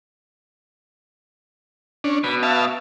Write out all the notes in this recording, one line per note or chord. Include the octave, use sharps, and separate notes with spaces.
C#4 D4
B2 B5
E5 F5 A5